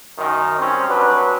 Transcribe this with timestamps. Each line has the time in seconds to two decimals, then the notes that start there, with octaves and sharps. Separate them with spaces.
0.18 F#2 D#3
0.59 G3 C4 C#4
0.88 F#3 D4 B4